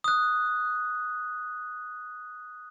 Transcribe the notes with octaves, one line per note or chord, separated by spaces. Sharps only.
D#6 F#6